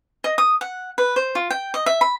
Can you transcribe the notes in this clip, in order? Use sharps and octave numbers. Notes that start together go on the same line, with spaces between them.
D#5
D#6
F#5
B4
C5
F4
G5
D#5
E5
B5